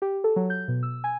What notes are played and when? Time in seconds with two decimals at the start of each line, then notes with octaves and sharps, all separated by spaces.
0.02 G4
0.24 A4
0.36 F#3
0.50 G6
0.68 B2
0.83 E6
1.04 G#5